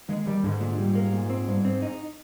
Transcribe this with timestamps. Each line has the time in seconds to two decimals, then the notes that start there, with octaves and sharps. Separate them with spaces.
0.09 D#2 G#3
0.27 D#2 G3
0.44 G#2 D3
0.60 A#2
0.78 G3
0.95 A#3
1.13 A#2
1.30 C4
1.48 G2
1.65 C4
1.82 D#4